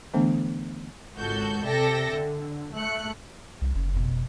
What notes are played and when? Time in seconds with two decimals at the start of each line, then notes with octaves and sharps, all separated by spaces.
0.14 D3 E3 A3 B3 D4
1.17 G#1 C#2 F#4 A4 G6
1.65 C3 A4 D5 E5 G5 A#6
2.14 D3
2.75 A3 F#6 C#7
3.62 C2
3.75 F#1 C#3
3.93 F1 B2